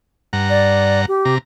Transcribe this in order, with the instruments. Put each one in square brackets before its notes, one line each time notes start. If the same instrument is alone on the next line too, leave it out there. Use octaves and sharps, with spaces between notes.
[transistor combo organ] G2 F#5 A#5
[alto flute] D5
G4
[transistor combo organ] C3 A#5